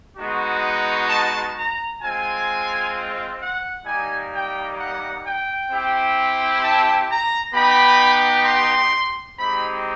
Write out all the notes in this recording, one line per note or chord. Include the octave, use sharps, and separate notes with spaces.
G#3 B3 D#4 F#4
A5
A#5
G#3 C4 F4 G#5
F#5
G3 A#3 D#4 G#5
G5
F#5
G5
C4 E4 G4
A5
A#5
B3 D#4 G4 B5
C6
G#3 C4 D#4 G4 B5